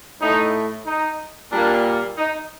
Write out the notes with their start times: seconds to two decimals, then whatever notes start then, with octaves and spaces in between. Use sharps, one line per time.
0.21 A2 A3 D#4
0.87 D#4
1.52 A#2 G3 A#3 D4
2.18 D#4